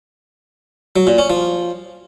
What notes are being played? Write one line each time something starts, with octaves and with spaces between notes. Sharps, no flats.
F#3
A#2
C#4
F3